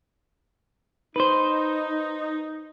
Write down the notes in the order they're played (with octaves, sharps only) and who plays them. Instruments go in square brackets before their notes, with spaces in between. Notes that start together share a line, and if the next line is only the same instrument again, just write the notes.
[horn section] D#4 [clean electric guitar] B4 C5